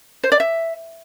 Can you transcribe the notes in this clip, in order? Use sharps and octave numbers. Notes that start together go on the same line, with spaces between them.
C5
D5
E5